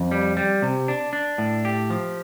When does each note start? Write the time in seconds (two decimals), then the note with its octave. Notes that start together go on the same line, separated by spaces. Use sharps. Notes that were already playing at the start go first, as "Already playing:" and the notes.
Already playing: F2
0.11 G3
0.37 G3
0.62 C3
0.88 D4
1.13 D4
1.38 A2
1.65 G4
1.90 F3